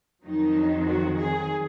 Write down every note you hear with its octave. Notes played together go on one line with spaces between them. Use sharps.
F2 D#3 F#3 D#4
F#4
G#4